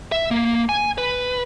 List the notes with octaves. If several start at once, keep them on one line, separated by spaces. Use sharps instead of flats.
E5
A#3
G#5
B4